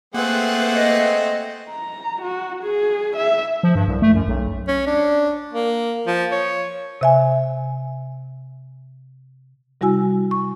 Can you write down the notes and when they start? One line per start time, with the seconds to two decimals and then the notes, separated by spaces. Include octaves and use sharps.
0.14 A3 A#3 C4 G#4 B4 F#5
0.75 D#5
1.70 A#5
2.22 F#4
2.63 G#4
3.17 E5
3.63 F3
3.75 G2
3.88 C2
4.02 A3
4.15 F#2
4.28 B1
4.68 C#4
4.87 D4
5.53 A#3
6.07 F3
6.32 C#5
7.01 C3 E5 G#5
9.81 C3 G3 E4 F#4 G#5 E6
10.31 C#6